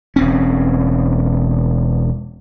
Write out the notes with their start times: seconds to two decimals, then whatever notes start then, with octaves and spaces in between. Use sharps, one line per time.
0.16 E1 C4 C#4